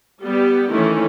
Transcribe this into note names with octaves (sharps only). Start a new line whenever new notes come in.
G3 B3 G4
D#3 E3 A3 C#4 E4